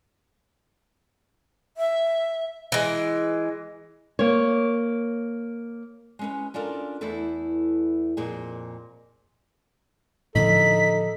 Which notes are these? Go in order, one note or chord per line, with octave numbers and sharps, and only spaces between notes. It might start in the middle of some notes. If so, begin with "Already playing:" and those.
E5
E3 G#3
A#3 C#5
G#3 C#4 B4
C#4 D4 F4 A4 A#4
E2 A3 E4 A4 B4
F2 A#2 G#4
A2 D3 F3 D#4 A4 B6